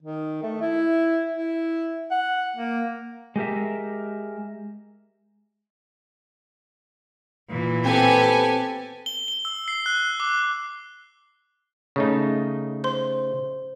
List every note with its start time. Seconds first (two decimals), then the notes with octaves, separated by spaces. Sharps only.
0.03 D#3
0.43 A3
0.62 E4
1.34 E4
2.11 F#5
2.56 A#3
3.36 G#3 G4 A#4 E5
7.50 A#2 E3
7.85 B3 C4 G4 A4 G#5
9.06 G7
9.28 G7
9.45 E6
9.68 C7
9.86 F#6
10.20 D6
11.96 C#3 A3 D#4
12.84 C5 C6